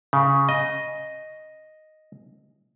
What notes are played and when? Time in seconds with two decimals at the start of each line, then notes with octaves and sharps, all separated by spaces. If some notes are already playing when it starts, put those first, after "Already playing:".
0.13 C#3
0.49 D#5